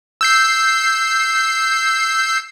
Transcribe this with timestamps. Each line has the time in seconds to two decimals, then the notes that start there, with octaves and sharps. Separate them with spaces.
0.21 E6 G6 C7